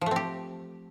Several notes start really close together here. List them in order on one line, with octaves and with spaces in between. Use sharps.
F3 A3 C4 G4